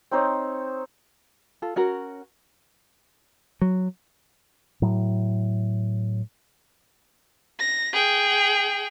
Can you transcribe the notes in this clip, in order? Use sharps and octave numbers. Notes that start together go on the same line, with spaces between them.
C4 D#4 C5 C#5
F4 A4
C#4 F#4 A#4
F#3
A2 F#3
A#6
G#4 G5